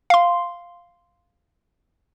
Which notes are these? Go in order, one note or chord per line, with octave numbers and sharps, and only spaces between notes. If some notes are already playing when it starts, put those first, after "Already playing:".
F5 C6